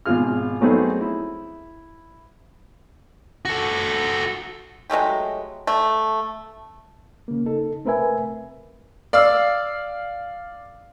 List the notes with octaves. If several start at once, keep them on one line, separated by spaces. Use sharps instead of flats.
G#1 B2 F4 G#4 F6
F#3 A3 B3 C4 D#4 G#4
E4
F#4 A4
F#3 G#3 A3 G4
A3
C#3 A#3
D#4 A4
A3 C4 A#4 B4 E5 G#5
D5 F5 E6